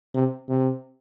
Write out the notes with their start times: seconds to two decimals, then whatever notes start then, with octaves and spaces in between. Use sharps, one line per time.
0.14 C3
0.48 C3